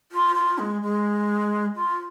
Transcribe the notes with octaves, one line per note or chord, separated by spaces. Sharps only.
F4
F4
G#3
G#3
F4